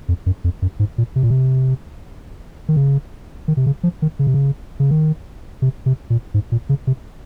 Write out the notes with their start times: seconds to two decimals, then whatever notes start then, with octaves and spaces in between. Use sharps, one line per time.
0.09 F2
0.26 F#2
0.44 F2
0.62 F#2
0.79 G#2
0.98 A#2
1.16 C3
1.23 A#2
1.30 C3
2.69 D#3
2.76 C#3
3.48 D#3
3.57 C3
3.66 C#3
3.83 F3
4.02 D#3
4.19 C#3
4.27 C3
4.34 C#3
4.80 C#3
4.91 D#3
5.62 C3
5.86 C3
6.10 A#2
6.34 G#2
6.52 A#2
6.69 C#3
6.87 C3